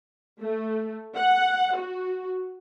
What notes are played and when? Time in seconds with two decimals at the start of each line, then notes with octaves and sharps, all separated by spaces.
0.41 A3
1.16 F#5
1.76 F#4